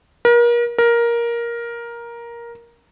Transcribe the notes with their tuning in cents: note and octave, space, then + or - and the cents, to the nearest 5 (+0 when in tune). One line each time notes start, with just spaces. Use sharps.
A#4 +35
A#4 +10